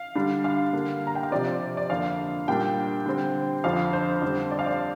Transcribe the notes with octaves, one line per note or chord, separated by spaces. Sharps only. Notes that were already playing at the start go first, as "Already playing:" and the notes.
Already playing: F5
D3 G3 D4
F5
D3 G3 A#3 D4
A#5
G5
F5
C3 F3 C4 D5
D5
F2 D3 A#3 F5
A#2 G3 A#3 D4 G5
D3 G3 C4
F2 D3 F3 F5
C5
F2 D3 G3 C4
D5
F5
D5